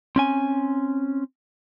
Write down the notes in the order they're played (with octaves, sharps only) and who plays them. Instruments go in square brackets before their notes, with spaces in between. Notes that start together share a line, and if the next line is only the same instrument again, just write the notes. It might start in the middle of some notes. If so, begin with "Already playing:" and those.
[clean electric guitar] C4 C#4 G#5